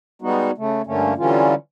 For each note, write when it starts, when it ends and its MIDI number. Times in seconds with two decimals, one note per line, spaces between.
0.22 0.51 55
0.22 0.51 56
0.22 0.51 59
0.22 0.51 63
0.22 0.51 66
0.58 0.82 49
0.58 0.82 57
0.87 1.14 43
0.87 1.14 50
0.87 1.14 57
0.87 1.14 58
0.87 1.14 61
1.18 1.54 50
1.18 1.54 52
1.18 1.54 54
1.18 1.54 55
1.18 1.54 61
1.18 1.54 65